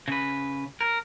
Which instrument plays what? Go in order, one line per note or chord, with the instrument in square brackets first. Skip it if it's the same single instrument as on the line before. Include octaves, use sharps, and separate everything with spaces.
[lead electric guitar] C#3 B4
A#4